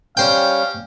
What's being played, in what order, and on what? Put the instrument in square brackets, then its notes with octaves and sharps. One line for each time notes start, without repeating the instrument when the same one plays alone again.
[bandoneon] G3 C#4 [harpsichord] C5 G5 [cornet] F5